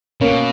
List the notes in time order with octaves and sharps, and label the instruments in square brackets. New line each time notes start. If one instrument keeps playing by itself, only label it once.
[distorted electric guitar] B2 [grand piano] A#3 C#4